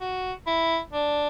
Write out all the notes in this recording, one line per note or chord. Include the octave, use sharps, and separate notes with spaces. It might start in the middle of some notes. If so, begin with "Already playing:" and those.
F#4
E4
D4